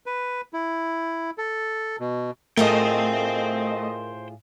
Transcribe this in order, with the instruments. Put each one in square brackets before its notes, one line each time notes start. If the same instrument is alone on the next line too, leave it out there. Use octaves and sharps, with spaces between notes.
[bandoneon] B4
E4
A4
B2
[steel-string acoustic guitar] A2 F4 G#4 [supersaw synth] A3 D#5 [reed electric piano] A#4 [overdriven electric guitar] C5 G5